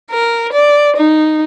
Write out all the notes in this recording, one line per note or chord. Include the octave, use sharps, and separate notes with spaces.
A#4
D5
D#4